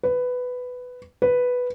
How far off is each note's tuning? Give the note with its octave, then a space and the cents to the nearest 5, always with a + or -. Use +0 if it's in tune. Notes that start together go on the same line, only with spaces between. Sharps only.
B4 +10
B4 +0